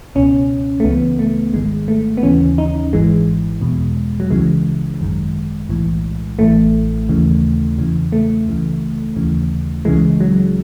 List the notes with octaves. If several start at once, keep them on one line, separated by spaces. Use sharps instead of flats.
C#2 B2 C#4
A3
C#2 C#3 E3 B3
A3
G#1 G#2 D#3 G#3
A3
B3
D#2 C#3 E3 C#4
D#4
G#1 G#2 E3 G#3
E2 B2
F#3
C#2 C#3 E3 G#3
G#1 F#2 D#3
B1 A2 E3
A1 A2 E3 A3
D#2 C#3 E3
E2 C#3 E3
A3
C#2 C#3 E3
D#2 C#3 E3
C#2 C#3 E3 G#3
F#3